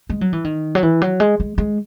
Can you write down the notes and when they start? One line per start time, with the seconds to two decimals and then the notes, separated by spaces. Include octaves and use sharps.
0.09 G#3
0.21 F#3
0.33 E3
0.44 D#3
0.75 F#3
0.83 E3
1.02 F#3
1.20 G#3
1.40 G#3
1.58 G#3